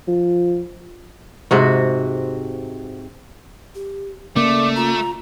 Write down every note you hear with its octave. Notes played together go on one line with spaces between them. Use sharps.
F3
G#2 C3 F#4
G4
C#3 A3 A#3 D5 D6
F4 A#5